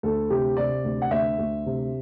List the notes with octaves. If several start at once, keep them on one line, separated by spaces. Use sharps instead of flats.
D2 A4
C3 G4
C3 D5
D2
F#5
D2 E5
D2
C3